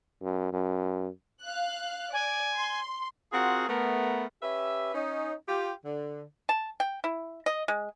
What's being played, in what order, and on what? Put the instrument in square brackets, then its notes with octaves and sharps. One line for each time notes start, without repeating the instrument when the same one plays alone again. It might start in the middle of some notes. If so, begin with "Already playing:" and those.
[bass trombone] F#2
F#2
[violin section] F5 F#6
[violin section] D5 [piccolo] G#5
[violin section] C6
[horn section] C4 F4 F#4 G#4 A#4 F#5
A3 B3 A#4
C#4 G4 B4 E5
C#4 D#4
F4 G4
D3
[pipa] A5
G5
E4
D#5
G#3